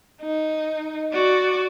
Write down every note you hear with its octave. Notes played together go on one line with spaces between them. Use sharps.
D#4
F#4 D5